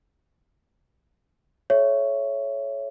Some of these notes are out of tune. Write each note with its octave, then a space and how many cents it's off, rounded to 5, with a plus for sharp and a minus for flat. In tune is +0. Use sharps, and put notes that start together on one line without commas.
A4 -40 C#5 +0 E5 +15